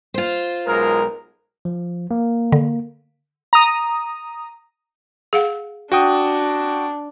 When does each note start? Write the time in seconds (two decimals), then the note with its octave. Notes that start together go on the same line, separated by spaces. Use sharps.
0.14 F4 C5
0.66 B1 G#3 A#4
1.65 F3
2.11 A#3
2.52 D3
3.53 A#5 D#6
5.33 G#4 F5 F#5
5.92 D4 F#4 G5 D#6